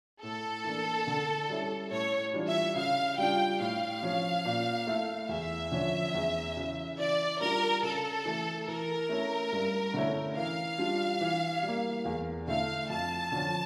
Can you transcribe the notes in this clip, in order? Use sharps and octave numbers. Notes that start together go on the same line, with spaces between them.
A2 A4
E3 A#3 D4
D3
G3 C#4 E4
A2 C#5
E3 G3 D4 F4
E5
C#3 F5
G3 D4 F4 G5
A2 F5
F3 C#4 F4
A#2
A3 E4
E2 E5
D3 F3 C#4
E2
C#3 E3
E3 D5
G3 D4 F4 A#4
C#3 A4
E3 A3
E3 A#4
A3 C#4 E4
G2
D3 A3 C#4 E4
E3 F5
G3 D4 F4
E3
G3
A#3
E2
D3 A3 E4 F5
F2 A5
D3 F3 C#4 F4